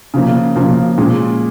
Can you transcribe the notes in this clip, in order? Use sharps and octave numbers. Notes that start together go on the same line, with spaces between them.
C#3 F3 A#3
C#3 F3 A#3
A#2 G#3 C#4